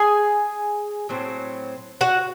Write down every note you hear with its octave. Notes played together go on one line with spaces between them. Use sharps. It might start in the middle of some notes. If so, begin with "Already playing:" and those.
Already playing: G#4 G#5
A2 F#3 C4
F#4 F#5